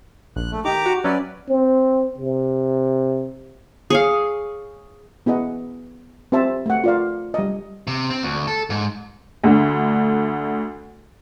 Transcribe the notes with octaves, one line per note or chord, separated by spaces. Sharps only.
A#1 F#6
A3
D#3 D#4 G4 A#5 D6
F#4
F#3 C#4 B4 D5 E5
C4
C3
G#4 C#5 F5
B3 E4 G#4 D#5 F#5
C4 G4 C5 E5 A5
A3 F#5
F4 D5 F5
G3 D#5
C3
C4
D2
A4
G#2
D2 D3